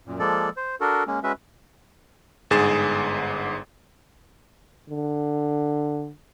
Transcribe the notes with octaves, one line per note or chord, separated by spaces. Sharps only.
F#2 A#2
F3 G#3 A#3 A4 D5
C5
D4 F#4 A4 A#4
G#3 A#3 C#4
G#3 C#4 F#4 B4 E5
G1 G#2 G#4 A6 E7
D3